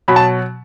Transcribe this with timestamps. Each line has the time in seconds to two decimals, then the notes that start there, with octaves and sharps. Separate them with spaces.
0.08 B2 F#3 B5
0.16 A5